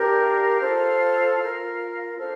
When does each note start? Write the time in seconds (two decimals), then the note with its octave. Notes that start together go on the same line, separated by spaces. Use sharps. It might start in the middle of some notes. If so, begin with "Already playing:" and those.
Already playing: D4 G4 A#4
0.21 F5 F6
0.61 F4 A4 C5
1.40 F4 A#4
2.17 D4 A4 C5 F5 F6